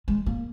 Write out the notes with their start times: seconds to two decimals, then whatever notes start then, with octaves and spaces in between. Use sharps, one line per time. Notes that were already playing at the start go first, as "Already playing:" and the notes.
0.08 G#3
0.26 A#3